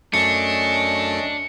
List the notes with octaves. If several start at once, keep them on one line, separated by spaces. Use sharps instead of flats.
F#2 A3 C#4 D4 D#5 C#7